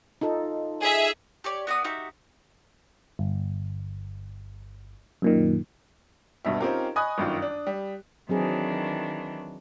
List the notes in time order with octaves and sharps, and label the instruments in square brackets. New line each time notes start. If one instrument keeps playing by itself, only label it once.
[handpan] D#4 F4 A4
[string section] G#4 E5
[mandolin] G4 C#5 D5
B3 F#4 D5 D#6
D#4 F#4 G4 E5
[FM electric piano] G1
F#2 A#2 D#3
[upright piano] D#1 G2 B2 E5
C4 C#4 D#4 F4 G4 A#4
D#5 G#5 B5 C#6 D#6 F#6
G1 F#2 D#3 F4
D4
G3
[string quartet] D#3 E3 D4 [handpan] F#3 C4 G#4